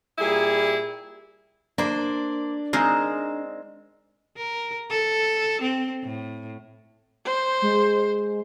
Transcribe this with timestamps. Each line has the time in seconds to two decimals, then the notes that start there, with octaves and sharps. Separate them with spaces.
0.18 A#2 G3 E4 G#4
1.78 A#3 D4 C5
2.73 G#3 C4 D#4 G#4 A#4
4.37 A#4
4.91 A4
5.62 C4
6.03 A2
7.26 C5
7.62 G#3